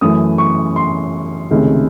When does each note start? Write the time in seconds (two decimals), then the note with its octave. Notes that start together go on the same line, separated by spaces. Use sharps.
0.01 F#2 E3 A3 D#6
0.38 C#6
0.76 C6
1.50 C#2 C3 D#3 A3 C#4